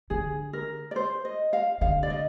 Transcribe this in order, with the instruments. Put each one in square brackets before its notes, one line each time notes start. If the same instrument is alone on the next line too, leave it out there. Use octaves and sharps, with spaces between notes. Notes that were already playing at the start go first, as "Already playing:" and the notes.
[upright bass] D3 [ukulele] G#4
[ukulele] A#4
D5
C5
D#5
F5
[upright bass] D3 [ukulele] F5
[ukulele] D5
D#5